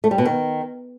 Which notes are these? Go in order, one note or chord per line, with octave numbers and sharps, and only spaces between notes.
A3
G3
B2
D#3